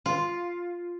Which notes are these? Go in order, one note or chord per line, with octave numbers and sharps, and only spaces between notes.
F4